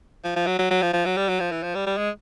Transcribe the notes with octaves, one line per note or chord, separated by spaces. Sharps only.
F3
F3
F#3
F#3
F#3
F3
F3
F#3
G3
F#3
F3
E3
F3
G3
G3
G#3